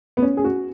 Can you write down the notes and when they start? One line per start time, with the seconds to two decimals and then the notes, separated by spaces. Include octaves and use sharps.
0.17 B3
0.22 C#4
0.37 G#4
0.44 F#4